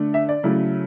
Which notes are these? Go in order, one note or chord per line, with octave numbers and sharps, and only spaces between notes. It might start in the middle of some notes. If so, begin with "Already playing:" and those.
Already playing: D3 A3 D4
E5
D5
C#3 F#3 A3 E4